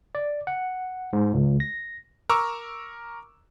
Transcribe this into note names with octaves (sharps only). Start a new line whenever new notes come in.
D5
F#5
G#2
C#2
A#6
A#4 A#5 C#6 D6 E6